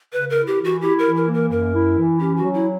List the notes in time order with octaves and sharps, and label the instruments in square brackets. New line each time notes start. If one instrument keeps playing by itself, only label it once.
[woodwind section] C#3 [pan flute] B4
[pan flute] A#4
[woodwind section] E4
[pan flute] G4
[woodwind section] E3
[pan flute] F#4
[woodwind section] E4 [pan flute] G4
[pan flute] A#4
[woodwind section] E3
[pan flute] A#4
[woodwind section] A#3
[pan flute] A#4
[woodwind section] F#2 [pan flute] A#4
[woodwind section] E4
E3
[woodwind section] C#4 [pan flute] G4
[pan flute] F#4
[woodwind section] F#3
[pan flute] E4